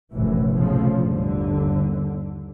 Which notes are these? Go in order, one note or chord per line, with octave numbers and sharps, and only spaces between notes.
F1 A#1 F#2 A2 E3
B1 A2 C#3 F3
G1 D#2 D3